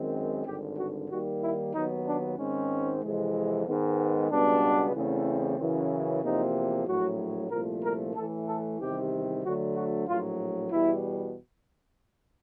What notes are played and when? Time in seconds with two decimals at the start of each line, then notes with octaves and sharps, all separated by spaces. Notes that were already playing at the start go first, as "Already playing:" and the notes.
Already playing: F#2 D#3 G#3 C4
0.46 G#1 G2 D3 G4
0.77 F#4
1.10 D#2 D#3 G3 A#3 F#4
1.42 E4
1.74 D#2 D#3 F#3 B3 D#4
2.06 D4
2.38 G#2 D#3 G#3 C4 C#4
3.03 F2 C3 E3 G#3
3.66 G#2 D#3 G#3 B3
4.30 C#2 B2 G3 B3 D4
4.94 E2 C#3 E3 A3 C4
5.59 F#2 C#3 E3
6.23 E2 C3 F3 A#3 D#4
6.87 A#1 A2 F#3 F#4
7.50 C2 A#2 F3 A3 A#4
7.83 A#4
8.15 A2 E3 A3 A4
8.47 A4
8.79 E2 C3 D#3 G3 G4
9.43 D2 D3 F#3 A3 F#4
9.75 F#4
10.07 A#1 A2 F#3 F4
10.72 E2 B2 G3 E4